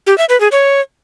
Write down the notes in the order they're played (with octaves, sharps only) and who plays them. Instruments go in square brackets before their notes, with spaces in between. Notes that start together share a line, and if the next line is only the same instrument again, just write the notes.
[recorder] G4
E5
B4
G#4
C#5